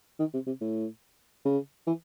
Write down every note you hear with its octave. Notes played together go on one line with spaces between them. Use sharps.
D#3
C3
C3
A2
C#3
E3